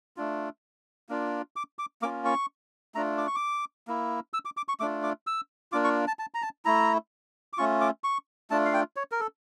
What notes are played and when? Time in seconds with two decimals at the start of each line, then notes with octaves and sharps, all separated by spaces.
0.17 A3 D4 F4
1.09 A#3 D4 F4
1.56 D6
1.79 D6
2.02 A#3 C#4 F4 D6
2.25 C#6
2.95 A3 D4 F4 A#5
3.18 D6
3.27 C#6
3.35 D6
3.88 A#3 E4
4.34 E6
4.45 D6
4.57 D6
4.68 C#6
4.80 A3 D4 F4 D6
5.03 D6
5.27 E6
5.72 A#3 D4 F4 D6
5.84 C#6
6.07 A5
6.19 A5
6.34 A#5
6.42 A5
6.65 A3 E4 A#5
7.53 D6
7.58 A3 C#4 F4 C#6
7.81 D6
8.04 C#6
8.50 A3 D4 F4 A5
8.65 F5
8.74 G5
8.96 C#5
9.12 A#4
9.20 A4